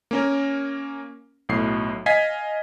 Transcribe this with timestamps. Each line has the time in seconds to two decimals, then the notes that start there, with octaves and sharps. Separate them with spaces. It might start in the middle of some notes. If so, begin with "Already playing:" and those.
0.11 A#3 C#4 A#4
1.49 B1 A2 C7
2.06 D#5 F5 G#5 G#6 B6 C7